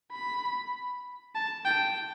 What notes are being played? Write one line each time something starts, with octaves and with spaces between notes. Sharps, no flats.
B5
A5
G5